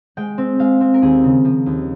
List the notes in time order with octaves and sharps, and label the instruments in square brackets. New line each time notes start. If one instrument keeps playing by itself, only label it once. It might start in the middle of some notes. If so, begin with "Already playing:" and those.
[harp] G#3 G5
C4
G#3 F5
C4
A#4
D#2 G#4
C#3
F3
D#2